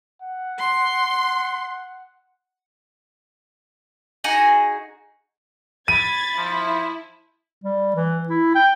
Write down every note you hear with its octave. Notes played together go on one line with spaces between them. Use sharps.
F#5
C6
D#4 F#4 G#4 G#5
B5 G#6 A6 D#7
F3 E4
G3
E3
E4
G5